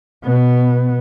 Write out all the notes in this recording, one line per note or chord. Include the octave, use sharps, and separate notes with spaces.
B2 B3